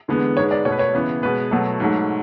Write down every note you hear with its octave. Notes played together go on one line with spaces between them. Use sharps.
E2 D3 G#3 B3
G#2 G#3 B3 C#5
D5
B2 A3 B4 C#5
C#5
C#3 E3 B3
B2 G#3 B3 B4
B2 F#3 A3
G#2 F#3 A3